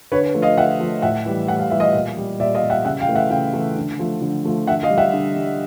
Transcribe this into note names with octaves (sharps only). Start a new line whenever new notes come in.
D3 B4 C#5
F3 A3
D#5 F5
D3 E5 F#5
F3 A3
A2 E5 F#5
E3 G3
A2 F#5
F5
E3 G3 E5
D#5 F5
A#2
G3
A#2 D5 E5
D#5 F5
G3
E5 F#5
C#3 E5 F#5
F5 G5
E3 A3
E5 F#5
C#3 F5 G5
E3 A3
D3
F3 A3
D3
F3 A3
D3 E5 F#5
D#5 F5
G3
E5 F#5
D3
G3